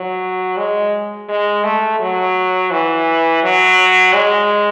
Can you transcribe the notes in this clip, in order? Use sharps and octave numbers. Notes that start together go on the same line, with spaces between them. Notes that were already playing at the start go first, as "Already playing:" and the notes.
Already playing: F#3
G#3
G#3
A3
F#3
E3
F#3
G#3